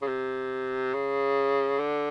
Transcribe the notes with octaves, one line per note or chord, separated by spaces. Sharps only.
C#3
C3
C#3
D3